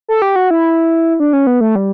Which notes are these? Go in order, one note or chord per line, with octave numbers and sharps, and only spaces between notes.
A4
G4
F#4
E4
D4
C#4
B3
A3
G3